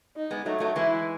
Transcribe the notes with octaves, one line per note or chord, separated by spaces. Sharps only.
D#4
G#3 B3
F#3 A3 D#4
F#3 A3
E3 G#3 E4